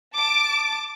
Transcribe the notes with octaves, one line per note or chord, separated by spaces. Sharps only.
A5 D6